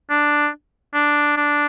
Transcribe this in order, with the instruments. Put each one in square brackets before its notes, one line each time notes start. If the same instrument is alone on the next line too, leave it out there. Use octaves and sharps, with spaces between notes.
[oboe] D4
D4
D4